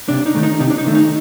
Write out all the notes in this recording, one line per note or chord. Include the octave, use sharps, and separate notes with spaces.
C3 D4
D#4
D#3 A3
D#4
C3 D#4
D4
D#4
D#3 A3
D#4